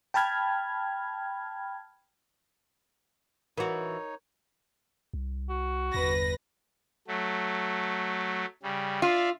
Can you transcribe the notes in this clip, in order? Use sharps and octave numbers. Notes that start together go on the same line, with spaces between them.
G5 A5 B5 F6 G#6
E3 D#4 F#4 A#4 C#5
C2
F#4
G1 E2 B4 A#6
F#3 A3
C#3 G3
F4 D5 E5 F5